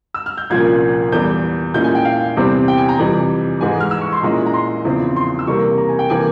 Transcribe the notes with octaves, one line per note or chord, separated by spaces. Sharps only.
E6
F6
G6
C2 A#2 F3 A#3 C#4 G#6
E2 E3 G3 G6
A#2 G#3 C#4 E4 G6
G#5
G5
F5
E2 C3 G3 C4 E4
G5
G#5
A#5
F2 C3 E3 G3
G#2 E3 G#3 G#5
F6
E6
C#6
C6
A#2 G#3 C#4 E4 A#5
A#5
C6
E2 C#3 F3 C4 E4
C6
E6
C3 E3 G3 A#3 C#6
A#5
G#5
G5
C3 E3 A#3 G#5